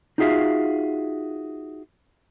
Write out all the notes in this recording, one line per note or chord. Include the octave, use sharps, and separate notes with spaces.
D#4 F4 F#4 G#4 E5 F5